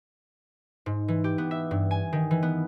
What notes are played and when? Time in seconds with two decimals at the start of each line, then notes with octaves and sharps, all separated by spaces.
0.86 G#2
1.08 E3
1.24 G4
1.38 B3
1.51 E5
1.71 G2
1.91 G#5
2.13 D#3
2.31 E3
2.43 B3